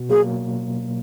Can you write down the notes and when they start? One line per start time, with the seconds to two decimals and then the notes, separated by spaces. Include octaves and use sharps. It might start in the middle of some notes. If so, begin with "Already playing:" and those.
Already playing: B2
0.09 F#3 A#3 G#4